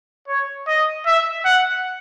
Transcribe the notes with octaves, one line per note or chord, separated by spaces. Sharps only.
C#5
D#5
E5
F#5